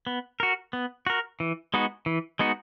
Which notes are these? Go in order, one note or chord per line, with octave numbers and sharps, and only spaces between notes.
B3
F#4 A#4
B3
F#4 A#4
E3
G#3 B3 D#4 F#4
E3
G#3 B3 D#4 F#4